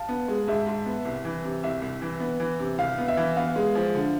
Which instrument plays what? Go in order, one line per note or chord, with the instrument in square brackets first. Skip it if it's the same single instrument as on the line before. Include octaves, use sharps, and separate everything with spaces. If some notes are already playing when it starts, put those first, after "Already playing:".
Already playing: [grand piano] F5 A5
[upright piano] B3
G#3
[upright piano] G#2 [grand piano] E5
[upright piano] G#2
B3
C2
E3
C3
[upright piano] C2 [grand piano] E5
[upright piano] C2
E3
B3
E3
C3
[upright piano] C2 [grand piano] F5
[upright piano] B3
[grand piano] E5
[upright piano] E3
[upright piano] B3 [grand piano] F5
[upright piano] G#3
F3
D3